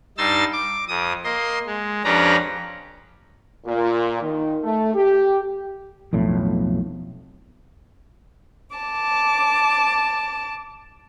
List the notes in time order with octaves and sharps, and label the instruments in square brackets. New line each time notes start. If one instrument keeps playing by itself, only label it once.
[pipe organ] G2 D#4 C6 E6 A6
D6
F2 D#6
A#3 D#5 C6
G#3
F2 C#4 D4 G4 B4 A#5
[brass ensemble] A#2
D#3
A3
G4
[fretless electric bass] B1 F2 A2
[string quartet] A5 D6